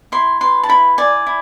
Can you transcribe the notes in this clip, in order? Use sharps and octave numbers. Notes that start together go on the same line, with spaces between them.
E4 C6
B4 C6
A5
E4 B5
D5 G#5
E4